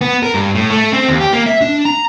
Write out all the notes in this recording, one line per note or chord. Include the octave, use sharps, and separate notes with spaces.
B3
A#4
G2
A2
A3
C4
D#2
G4
A#3
E5
D4
A#5